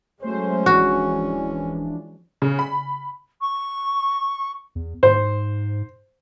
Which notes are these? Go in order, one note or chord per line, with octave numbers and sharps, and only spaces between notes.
F#3 G#3 A3 C#4 C5
D1 E3 F3 D4 F#4
C#3
B5
C#6
E2
G#2 C5